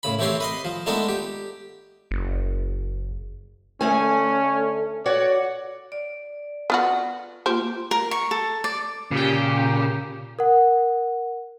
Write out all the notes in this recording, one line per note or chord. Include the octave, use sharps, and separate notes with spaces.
A2 C#3 B5
E3 A3 C4 G4 C#5 C6
B4 D#5 C6
F3
G#3 A3 B3 D4 D#4 A4
G4
F#1
D2 A3 C#4 G#5
F#4 C#5 D5 F#5
D5
B3 F4 F#4
A#3 F4 G4 C5
A#4
C#6
A4
D5
A#2 C#3 G4
A#4 F#5